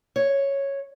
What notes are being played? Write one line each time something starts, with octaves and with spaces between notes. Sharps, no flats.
C#5